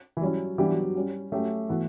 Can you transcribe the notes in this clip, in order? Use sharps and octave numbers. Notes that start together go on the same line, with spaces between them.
E3
F#3 G3 C#4 E4
E3 G3 B3 D4 G4
F#3
F#3
G3 C#4 F#4
F#3 A3 C#4 G4
E3 B3 F#4 A4